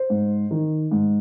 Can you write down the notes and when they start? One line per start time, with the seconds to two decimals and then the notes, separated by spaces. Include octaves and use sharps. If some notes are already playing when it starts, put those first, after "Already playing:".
Already playing: C5
0.10 G#2
0.51 D#3
0.91 G#2